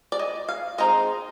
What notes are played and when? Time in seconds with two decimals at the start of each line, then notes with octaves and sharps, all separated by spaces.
0.12 D5
0.19 D#5
0.49 F5
0.78 G#3 C4 D#4 D#5